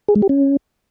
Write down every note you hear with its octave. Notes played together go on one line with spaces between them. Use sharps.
G#4
G#3
G4
C#4